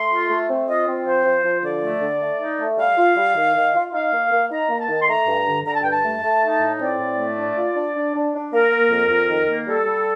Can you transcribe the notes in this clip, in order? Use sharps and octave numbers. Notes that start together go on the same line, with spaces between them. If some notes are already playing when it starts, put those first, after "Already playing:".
Already playing: A3 C6
F4
A3
C4
F4 D#5
C4
F3 C5
F3
F3
D3 D5
A3
D3
A3
D#4
A3
G3 F5
F4
G3
D#3
D#3
F4
D#4 F5
A#3
A#3
D#4 A#5
A#3
A5
D#3
C6
A3 A#5
G2
D3
D3 A#5
A5
G2 G5
A5
A3
A3
D#4
A2
C4 D5
A2
A3
D4
F4
D4
D4
D4
D4
A#3 A#4
A#3
F2
F2
D#3
A#3
G3 A4
G3